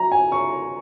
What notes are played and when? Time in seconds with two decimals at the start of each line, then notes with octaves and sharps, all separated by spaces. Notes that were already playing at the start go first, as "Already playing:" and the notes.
Already playing: F#3 A#5
0.12 G#5
0.32 C#6